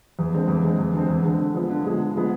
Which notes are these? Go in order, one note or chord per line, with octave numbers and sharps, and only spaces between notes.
E2
D3 G#3 C4
E2
D3 G#3 C4
E2
D3 G#3 C4
E2
D3 G#3 C4
D3
F3 G#3 B3
D3
F3 G#3 B3
D3
F3 G#3 B3